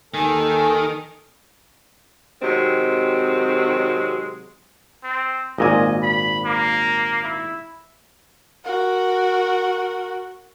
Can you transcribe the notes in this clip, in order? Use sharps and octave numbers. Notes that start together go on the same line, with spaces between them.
D#2 D#3 A4 G#5
C3 D#3 F#3 G#3 C4
C4
G#1 A#2 D#5 G#5
B5
A#3
E4
F#4 A#4